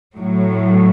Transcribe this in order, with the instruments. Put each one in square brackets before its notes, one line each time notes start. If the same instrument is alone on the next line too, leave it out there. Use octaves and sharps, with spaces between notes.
[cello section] A2 F#3